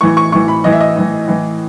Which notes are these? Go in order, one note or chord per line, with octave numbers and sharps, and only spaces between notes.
A2 E3 C#6
C#6
A2 E3 C#6
B5
A2 E3 D#5
E5
D#5
A2 E3
A2 E3